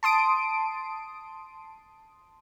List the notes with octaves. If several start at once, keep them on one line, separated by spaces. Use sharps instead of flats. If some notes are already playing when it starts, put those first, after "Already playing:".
A5 C6 D#6 D7